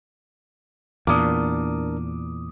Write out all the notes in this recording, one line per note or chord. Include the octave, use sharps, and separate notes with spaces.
E2 A#2 D4 A#4 D6 D#6